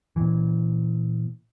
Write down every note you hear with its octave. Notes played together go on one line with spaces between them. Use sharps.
A#2 E3